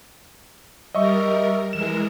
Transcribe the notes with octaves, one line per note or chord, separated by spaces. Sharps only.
G3 A#4 D#5 E5 C#6
E3 G#3 A#4 E7